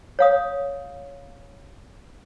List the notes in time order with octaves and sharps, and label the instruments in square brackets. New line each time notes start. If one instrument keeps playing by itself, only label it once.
[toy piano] C#5 F5 D#6